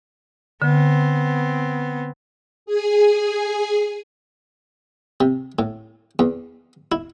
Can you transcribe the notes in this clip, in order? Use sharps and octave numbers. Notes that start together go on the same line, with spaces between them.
D3 B3 C4
G#4 G#5
C3
A2
E2
E4